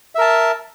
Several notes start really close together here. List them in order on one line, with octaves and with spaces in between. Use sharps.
E5 A#4 A5